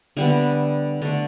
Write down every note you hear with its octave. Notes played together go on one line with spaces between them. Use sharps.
D3 G3 B3 E5
D3 A3 D5